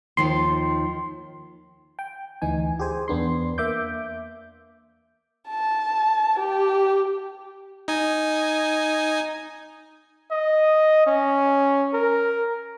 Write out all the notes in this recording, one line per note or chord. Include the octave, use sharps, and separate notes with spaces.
D#2 D#3 F3 C6
G5
D2 E3 D#4 G#5
G4 G#4 C5 G#5
E2 B3 D4 C6
A#3 E5 D6 G6
A5
G4
D#4 G#5
D#5
C#4
A#4